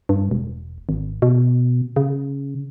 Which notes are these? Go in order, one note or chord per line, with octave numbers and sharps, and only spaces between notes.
G2
E1
G#1
B2
C#3